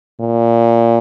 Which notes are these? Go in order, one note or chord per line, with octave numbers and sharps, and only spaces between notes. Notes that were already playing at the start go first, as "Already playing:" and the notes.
A#2